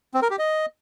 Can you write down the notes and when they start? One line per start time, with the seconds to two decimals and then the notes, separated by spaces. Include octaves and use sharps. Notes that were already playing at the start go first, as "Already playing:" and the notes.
0.14 C4
0.22 A#4
0.30 G4
0.39 D#5